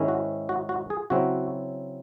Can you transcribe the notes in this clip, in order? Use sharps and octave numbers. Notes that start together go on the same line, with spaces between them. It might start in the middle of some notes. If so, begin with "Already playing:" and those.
Already playing: G#2 D#3 G#3 C#4 E4
F#4
F#4
F#4
G#4
C#3 F#3 C4 E4 F#4